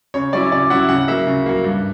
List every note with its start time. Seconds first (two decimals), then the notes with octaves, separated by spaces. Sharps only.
0.14 C#3 C#5
0.33 F#3 C#4 E4 D5
0.52 C#3 D5
0.70 F#3 C#4 E4 F#5
0.89 C#3 F#5
1.08 F#3 A#3 E5
1.27 C#3
1.46 F#3 A#3
1.64 G2